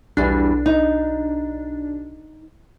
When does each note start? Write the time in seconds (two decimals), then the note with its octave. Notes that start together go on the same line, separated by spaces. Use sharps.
0.17 B1 E2 G3 D4
0.66 D#4